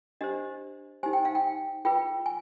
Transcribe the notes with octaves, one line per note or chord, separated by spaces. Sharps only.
D4 G4 C5 D#5
D#4 G4 C5 G#5
G5
F5
G5
F4 G#4 B4 G5
G#5